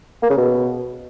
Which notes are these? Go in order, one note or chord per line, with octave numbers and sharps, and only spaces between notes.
A#3
C#3
B2